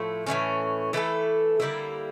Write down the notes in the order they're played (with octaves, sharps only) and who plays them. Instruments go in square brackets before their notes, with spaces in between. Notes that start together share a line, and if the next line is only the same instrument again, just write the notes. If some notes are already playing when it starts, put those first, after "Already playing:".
Already playing: [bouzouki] A2 F3 A3 E4
A2 E3 G3 C#4
E3 A3 E4 A4
D3 G3 A#3 E4